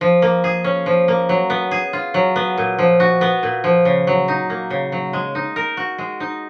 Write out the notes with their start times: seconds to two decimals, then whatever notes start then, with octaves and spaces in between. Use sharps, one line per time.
0.01 F3
0.22 A#3
0.44 G#4
0.64 C#4
0.86 F3
1.08 A#3
1.29 F#3
1.50 B3
1.71 G#4
1.93 F4
2.14 F#3
2.36 B3
2.57 A#2
2.79 F3
3.00 F#4
3.21 B3
3.43 A#2
3.64 F3
3.85 C#3
4.07 F#3
4.28 D#4
4.50 A#3
4.70 C#3
4.92 F#3
5.13 G#3
5.35 D#4
5.56 A#4
5.77 F#4
5.98 G#3
6.20 D#4